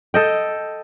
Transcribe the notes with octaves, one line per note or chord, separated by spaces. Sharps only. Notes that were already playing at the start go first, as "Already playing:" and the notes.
A4 D#5 G5